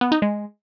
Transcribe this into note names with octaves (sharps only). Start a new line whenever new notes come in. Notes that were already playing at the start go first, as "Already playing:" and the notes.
B3
D#4
G#3